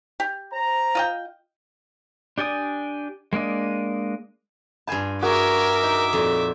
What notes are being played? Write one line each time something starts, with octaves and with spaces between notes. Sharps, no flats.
G4
C5 A#5
F4 D#5 G5
D4 G4 D5 G#5 D#6
G#3 A#3 D4 D#5
G2 F4 G#5 A5 B5
F#4 G#4 A#4 E5 F#5 D6
D#4
F2 A#2 F#4